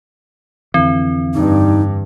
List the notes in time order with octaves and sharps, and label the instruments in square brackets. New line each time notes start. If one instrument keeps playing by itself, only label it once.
[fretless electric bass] F2 D3 E3 [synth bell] C4
[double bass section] G2 [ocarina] D#4